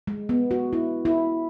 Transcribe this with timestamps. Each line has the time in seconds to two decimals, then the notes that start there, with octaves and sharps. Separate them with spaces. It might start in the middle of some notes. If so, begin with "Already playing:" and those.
0.07 G#3
0.29 B3
0.51 F#4
0.73 E4
1.05 E4